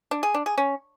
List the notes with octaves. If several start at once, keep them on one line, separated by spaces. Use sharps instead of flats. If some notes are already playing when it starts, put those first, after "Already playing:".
D4
G#4
D4
G#4
C#4